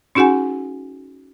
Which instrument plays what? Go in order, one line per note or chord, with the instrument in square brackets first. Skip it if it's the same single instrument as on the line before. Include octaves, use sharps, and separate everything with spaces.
[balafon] C#4 D#4 F#4 G#4 F#5 G#5